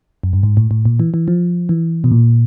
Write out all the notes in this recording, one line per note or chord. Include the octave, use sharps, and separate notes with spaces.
F#2
G2
G#2
A2
A2
A#2
E3
E3
F3
E3
B2
A#2